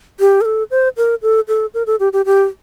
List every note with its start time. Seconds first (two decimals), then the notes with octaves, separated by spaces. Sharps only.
0.20 G4
0.41 A#4
0.45 A4
0.71 C5
0.97 A#4
1.22 A4
1.48 A4
1.74 A#4
1.87 A4
2.00 G4
2.13 G4
2.26 G4